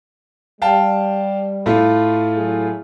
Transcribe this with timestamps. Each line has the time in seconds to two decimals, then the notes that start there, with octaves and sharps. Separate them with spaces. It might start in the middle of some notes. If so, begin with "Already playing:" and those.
0.62 G3 F5 G5 A5
1.66 A2 A3 F4
2.37 F#3 E4 G#4